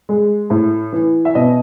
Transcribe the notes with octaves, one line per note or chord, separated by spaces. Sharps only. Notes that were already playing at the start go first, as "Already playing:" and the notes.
G#3
A2
E3
E5
B2 D#5